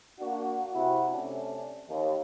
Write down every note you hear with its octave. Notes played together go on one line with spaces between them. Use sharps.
A#3 D4 F#4
C3 E4 F#4
C3 A3 C#4 D4
D#2